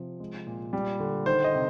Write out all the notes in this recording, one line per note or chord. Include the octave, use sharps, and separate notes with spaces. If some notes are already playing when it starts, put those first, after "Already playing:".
Already playing: C3 F3
G#3
A#2
G3
D3
D#3 C5
D#5
C3